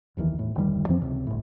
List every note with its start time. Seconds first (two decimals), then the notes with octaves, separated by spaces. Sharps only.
0.17 F1 D#2 D#3 E3
0.38 E1 A2
0.55 F1 D2 D#3 G3
0.88 F2 E3 F3 C4
1.01 C#2 C3
1.27 G1 A2